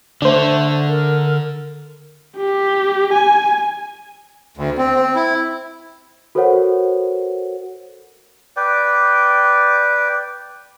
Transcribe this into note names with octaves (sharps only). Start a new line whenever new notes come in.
D3 A3 D4 C5
A#4
G4
G#5
D2
C4
C4
E4
F#4 A4 A#4 C5 C#5 F#5
B4 D5 G5